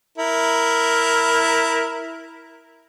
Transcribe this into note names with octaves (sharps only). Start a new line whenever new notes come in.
E4 A#4